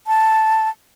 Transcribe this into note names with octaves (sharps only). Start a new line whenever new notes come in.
A5